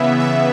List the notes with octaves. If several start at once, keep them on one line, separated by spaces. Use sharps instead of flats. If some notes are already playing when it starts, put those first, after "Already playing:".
Already playing: C#3 E3 B3 E5
E5